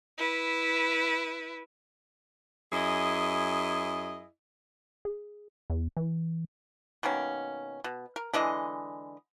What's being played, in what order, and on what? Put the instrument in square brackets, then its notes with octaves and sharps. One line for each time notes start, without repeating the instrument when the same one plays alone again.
[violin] E4 B4
[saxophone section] F#2 E4 G#4 D#5
[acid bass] G#4
E2
E3
[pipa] B2 D#3 A#3 C#4
B2
A#4
D3 E3 G#3 D#5